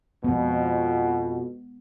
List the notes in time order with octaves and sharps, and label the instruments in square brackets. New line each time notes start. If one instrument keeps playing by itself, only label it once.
[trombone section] F2 B2 [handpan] G#3 B3